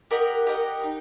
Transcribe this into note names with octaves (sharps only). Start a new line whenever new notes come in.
G4 A#4 D#5 F#5
G4 A#4 D#5 F#5
D#4